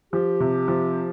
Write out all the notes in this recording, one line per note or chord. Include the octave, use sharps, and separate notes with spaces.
F3 G4
C3
F3